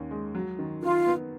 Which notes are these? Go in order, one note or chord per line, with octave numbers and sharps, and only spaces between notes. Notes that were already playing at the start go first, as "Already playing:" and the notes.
Already playing: D#2 C#4
G#3
F#3
D#3
D#3 F4
B3